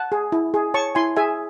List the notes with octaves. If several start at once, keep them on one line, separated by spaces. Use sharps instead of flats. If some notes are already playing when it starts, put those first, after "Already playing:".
Already playing: F#5 A5
G#4
E4
G#4
C#5 A5 C#6
E4 G#5 C6
G#4 E5 G#5